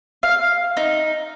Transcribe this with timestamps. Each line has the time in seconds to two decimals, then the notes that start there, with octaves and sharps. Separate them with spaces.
0.23 F5
0.77 D#4